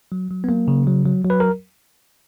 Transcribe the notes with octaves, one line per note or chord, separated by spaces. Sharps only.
F#3
F#3
B3
F#3 A#3
C#3
F#3
F#3
F#3
B4
A#4